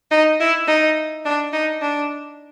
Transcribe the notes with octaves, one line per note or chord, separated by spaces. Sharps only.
D#4
E4
D#4
D4
D#4
D4